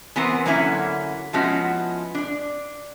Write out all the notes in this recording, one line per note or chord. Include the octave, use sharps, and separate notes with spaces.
E3 B3 C4 A#4 C5
D3 F#3 A#3 C#4 E4
F3 G#3 B3 C#4 E4 F#4
D4 D5